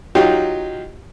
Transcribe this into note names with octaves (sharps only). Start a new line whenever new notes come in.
F#3 D#4 F4 G4